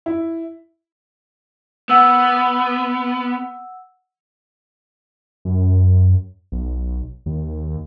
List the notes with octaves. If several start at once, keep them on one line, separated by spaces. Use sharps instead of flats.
E4
B3 F#5 E6
F#2
B1
D#2